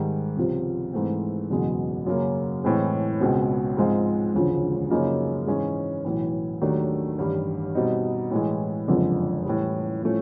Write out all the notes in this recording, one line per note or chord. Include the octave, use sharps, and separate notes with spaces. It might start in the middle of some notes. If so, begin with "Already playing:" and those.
Already playing: G#2 D#3 G3
C#2 C3 F3
G#2 E3 A3 C4
F#1 E2 B2 G#3
F#2 C#3 F#3 A#3
A2 E3 G#3 C4
C#2 B2 G#3 C4
G#2 F3 G#3 C4 F4
E1 D2 C#3 F3
F#2 C#3 F3 A#3 D#4
G#2 E3 G#3 C#4
B1 A2 E3
D#2 D#3 F#3 A3 D4
A1 G2 D#3 G3
B2 G3 C4 D#4
A2 E3 G#3
F#1 F2 D3 F3 G#3
A2 E3 G3
A2 F3 A3 C#4